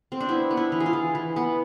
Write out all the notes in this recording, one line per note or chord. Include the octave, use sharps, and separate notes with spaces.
C4
D4
B3 E4
B3
E4
E3
G#4
F4
E3
E3
B3